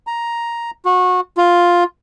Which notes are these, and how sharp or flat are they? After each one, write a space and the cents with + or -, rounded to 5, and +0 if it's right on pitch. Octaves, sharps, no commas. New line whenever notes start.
A#5 +5
F#4 -25
F4 +5